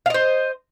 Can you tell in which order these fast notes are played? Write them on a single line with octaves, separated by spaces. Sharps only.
F5 D#5 C5